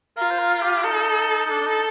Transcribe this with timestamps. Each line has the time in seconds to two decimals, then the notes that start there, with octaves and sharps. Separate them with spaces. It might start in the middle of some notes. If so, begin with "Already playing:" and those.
0.17 F4 A#4
0.31 C5
0.39 A#4
0.62 G4
0.83 D#4 A4
1.46 D#4
1.50 D4 A4
1.61 D4
1.66 D#4